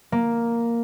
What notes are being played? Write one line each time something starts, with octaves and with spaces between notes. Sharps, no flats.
A#3